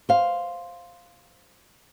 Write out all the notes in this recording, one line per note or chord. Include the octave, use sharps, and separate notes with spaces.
C5 F5